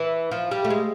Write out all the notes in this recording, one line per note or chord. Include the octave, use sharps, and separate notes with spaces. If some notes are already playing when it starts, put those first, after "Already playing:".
Already playing: E3
F3
G3
A3
G#3